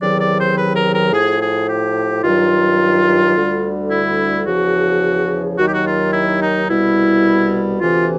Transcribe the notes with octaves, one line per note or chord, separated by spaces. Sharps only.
E2 C3 D#3 F#3 D5
D5
C5
B4
A#4
A#4
A2 F3 G#4
G#4
G4
G2 D#3 F#3 F4
D2 D3 G3
E4
E2 C#3 F3 F#4
D#2 D#3 F#3 F#4
G4
F#4
F4
E4
D#4
C2 B2 G3 E4
D2 C3 E3 F4